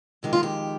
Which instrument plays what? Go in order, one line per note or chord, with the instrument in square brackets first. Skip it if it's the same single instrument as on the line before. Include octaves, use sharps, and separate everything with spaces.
[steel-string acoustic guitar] F2 D#3 G#3 G4
F4
G4